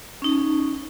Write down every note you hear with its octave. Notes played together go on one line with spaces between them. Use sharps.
C#4 D#4